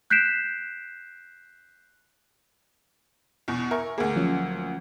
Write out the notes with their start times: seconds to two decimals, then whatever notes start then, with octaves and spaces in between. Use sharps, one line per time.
0.10 F#6 G6 B6 C7 D7 E7
3.48 E2 B2
3.71 A#4 E5 G#5 C#6
3.98 D2 A#3 G#4 G#5
4.16 F3 F#3 C#4